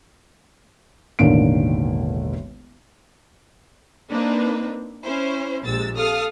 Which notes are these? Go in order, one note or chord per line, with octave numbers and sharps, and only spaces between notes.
E1 A1 D3 D#3 A#3 D7
A#3 C4 D4 D#4 B4
C#4 E4 C5
A#1 C3 G#3 E6 A6
A4 F5 D#6 F6